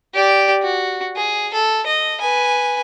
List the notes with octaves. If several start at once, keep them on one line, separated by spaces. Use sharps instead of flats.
G4 D5
F#4
G#4
A4
D#5
B4 G#5